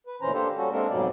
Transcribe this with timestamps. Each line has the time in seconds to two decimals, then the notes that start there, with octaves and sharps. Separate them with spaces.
0.06 B4
0.21 D2 A#2 E3 C#4 C5 A#5
0.33 A#3 D4 G4 A4 C5
0.58 G3 C#4 F#4 A4
0.72 G#3 A#3 C4 D4 A4 A#4
0.90 F2 G#2 B2 F#3 G3 D5